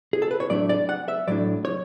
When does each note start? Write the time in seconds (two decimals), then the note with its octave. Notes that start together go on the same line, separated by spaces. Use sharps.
0.13 G#4
0.22 A4
0.31 B4
0.40 C#5
0.50 A2 F#3 A3 D4 D5
0.69 D5
0.89 F#5
1.08 E5
1.27 A2 F#3 A3 D4 D5
1.65 C#5